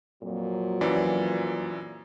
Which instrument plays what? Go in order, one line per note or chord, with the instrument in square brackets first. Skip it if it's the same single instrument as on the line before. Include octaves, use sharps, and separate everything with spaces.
[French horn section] F2 A#2 F#3
[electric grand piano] F#2 E3 D5